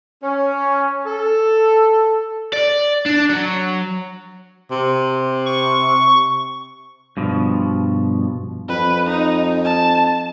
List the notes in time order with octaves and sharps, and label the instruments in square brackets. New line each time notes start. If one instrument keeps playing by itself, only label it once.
[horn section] C#4
A4
[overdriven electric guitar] D5
D4
F#3
[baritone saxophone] C3
[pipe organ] C#6
[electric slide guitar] G2 B2 F3
[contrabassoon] F2 [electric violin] B4
[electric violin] D#4
A5